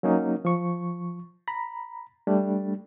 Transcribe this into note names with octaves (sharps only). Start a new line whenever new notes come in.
F#3 A#3 C#4 D#4
F3 C#6
A#5 B5
G3 A3 D4